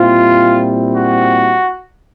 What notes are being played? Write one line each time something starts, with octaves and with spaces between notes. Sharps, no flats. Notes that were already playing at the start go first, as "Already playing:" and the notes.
Already playing: A#2 G3 C4 E4 F4
F#4